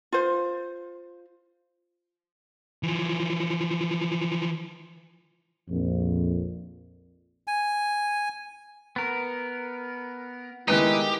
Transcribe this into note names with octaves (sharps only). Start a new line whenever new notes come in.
F4 C5
E3 F3
A#1 F2
G#5
B3 A#4
D#3 G#3 B3 D#4 E4 G4 F#6